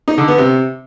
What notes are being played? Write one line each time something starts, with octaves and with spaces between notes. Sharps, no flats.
D#4
D3
B3
C3